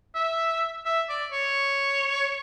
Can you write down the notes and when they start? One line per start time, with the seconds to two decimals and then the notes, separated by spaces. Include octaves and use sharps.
0.15 E5
0.86 E5
1.09 D5
1.32 C#5